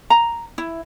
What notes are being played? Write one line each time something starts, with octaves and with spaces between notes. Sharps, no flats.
A#5
E4